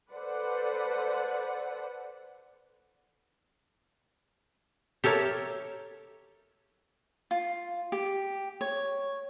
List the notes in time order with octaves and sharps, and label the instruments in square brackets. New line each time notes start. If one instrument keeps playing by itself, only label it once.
[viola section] A4 B4 C5 D5 F#5
[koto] G4 A4 A#4 C#5 E5
[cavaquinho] F4
G4
C#5